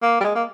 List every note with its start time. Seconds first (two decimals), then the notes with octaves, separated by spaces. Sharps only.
0.02 A#3
0.20 G3
0.24 G#3
0.35 A#3